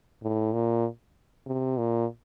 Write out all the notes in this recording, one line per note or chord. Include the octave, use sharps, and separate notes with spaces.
A2
A#2
C3
A#2